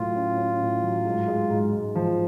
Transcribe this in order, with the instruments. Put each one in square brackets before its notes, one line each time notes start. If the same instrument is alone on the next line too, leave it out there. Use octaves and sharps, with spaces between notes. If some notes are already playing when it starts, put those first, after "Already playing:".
Already playing: [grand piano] A2 F#3 [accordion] F4
[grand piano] C#4
C#4
A2
F#3
G#2
G#3
G#2
G#2
F3